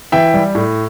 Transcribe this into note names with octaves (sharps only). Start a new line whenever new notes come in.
E3 E5 G5
G3
A2